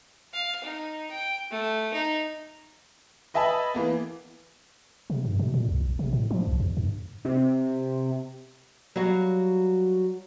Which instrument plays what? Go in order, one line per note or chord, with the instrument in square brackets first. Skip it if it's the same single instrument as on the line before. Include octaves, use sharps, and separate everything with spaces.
[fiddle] F5
D#4
G5
A3
D#4
[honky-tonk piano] B4 D#5 E5 G#5 A5 B5
E3 A#3 B3
[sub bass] C3
G2
B2
A#2
C#2
A#1
C3
A2
F3
B1
E2
G2
[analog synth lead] C3
[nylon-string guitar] F#3 G3 F#4 F5